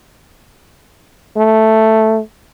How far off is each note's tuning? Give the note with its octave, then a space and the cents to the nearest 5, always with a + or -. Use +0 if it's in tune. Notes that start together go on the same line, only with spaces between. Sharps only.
A3 +0